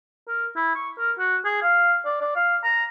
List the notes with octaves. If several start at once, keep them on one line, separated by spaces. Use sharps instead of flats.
A#4
E4
C#6
A#4
F#4
G#4
F5
D5
D5
F5
A#5